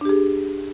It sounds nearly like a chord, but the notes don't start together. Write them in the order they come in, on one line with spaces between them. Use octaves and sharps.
D4 G4 G#4